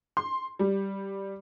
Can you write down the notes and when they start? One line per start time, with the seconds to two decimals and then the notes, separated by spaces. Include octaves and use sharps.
0.17 C6
0.59 G3